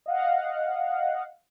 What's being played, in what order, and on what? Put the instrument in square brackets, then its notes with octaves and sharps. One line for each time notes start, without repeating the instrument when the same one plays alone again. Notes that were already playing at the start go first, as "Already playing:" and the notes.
[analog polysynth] D#5 F5 F#5